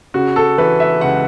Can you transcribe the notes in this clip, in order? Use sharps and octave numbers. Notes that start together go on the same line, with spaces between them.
C#3 F#4
A4
E3 B4
E5
C#2 F#5